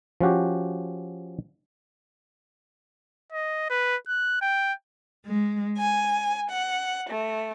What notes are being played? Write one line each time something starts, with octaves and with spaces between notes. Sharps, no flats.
F3 C#4 F#4 G4
D#5
B4
F#6
G5
G#3
G#5
F#5
A3